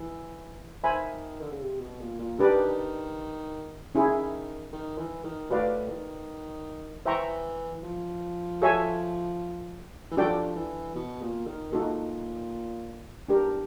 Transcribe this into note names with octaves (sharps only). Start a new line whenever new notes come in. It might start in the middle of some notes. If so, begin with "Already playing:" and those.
Already playing: E3
D#3 C5 E5 G#5 B5
D3
C#3
C3
B2
A#2
A#2
D#3 D4 G4 B4 D5
D#3 C#4 E4 G#4
D#3
E3
D#3
A2 F#4 B4 D5 F5
D#3
E3 C5 E5 G5 A#5 C#6
F3
F#4 A4 C#5 E5 G#5
E3
F3 D4 F#4 A4 D5 G5
E3
B2
A#2
D#3
A#2 D#4 F#4 A4
E2 D4 G4 A#4